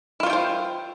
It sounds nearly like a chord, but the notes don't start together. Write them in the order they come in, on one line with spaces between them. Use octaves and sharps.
E4 F4 C#5 G5 C5